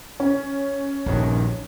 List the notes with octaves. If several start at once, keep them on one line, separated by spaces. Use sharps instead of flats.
C#4
A#1 G2 D#3